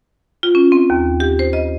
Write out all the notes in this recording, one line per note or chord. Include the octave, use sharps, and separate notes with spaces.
F4
C#4
C4
D#2
G4
C5
D#5